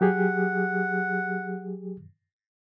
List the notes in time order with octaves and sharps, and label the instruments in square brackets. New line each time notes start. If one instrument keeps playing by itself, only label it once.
[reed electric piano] F#3 G4 G#4 [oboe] F#5